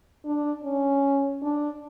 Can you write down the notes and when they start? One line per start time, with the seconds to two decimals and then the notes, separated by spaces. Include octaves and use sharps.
0.25 D4
0.64 C#4
1.42 D4